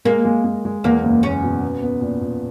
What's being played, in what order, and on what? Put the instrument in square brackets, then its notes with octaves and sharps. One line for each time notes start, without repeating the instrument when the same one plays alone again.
[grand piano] G#3 [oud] A#3
[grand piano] G#3
G#3
G#3
[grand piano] E2 [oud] A#3
[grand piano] F#1
[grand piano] F#1 [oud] C#4
[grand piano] B2
B3
B3
A#2
A#2